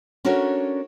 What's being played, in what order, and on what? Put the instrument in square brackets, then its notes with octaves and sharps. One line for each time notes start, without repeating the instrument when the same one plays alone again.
[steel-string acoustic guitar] C#4 D4 F#4 A4 A#4 C#5